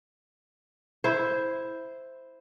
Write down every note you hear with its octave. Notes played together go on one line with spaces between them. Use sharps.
E4 C5